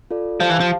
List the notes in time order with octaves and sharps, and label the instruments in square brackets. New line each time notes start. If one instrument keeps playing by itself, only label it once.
[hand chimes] F4 A4 D5
[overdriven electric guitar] F3 [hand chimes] G4 C5 F5 A5
[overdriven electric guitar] E3
F3